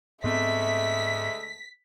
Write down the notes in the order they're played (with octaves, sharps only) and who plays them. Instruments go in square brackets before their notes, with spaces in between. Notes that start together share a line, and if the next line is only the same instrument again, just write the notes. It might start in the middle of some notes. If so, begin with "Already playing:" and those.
[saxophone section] D2 G#3 A3 [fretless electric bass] G#2 B3 C4 [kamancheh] E5 [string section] B6